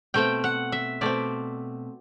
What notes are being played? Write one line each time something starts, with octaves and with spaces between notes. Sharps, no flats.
B2 A3 C4 G5
F#5
E5
B2 A3 C4 D5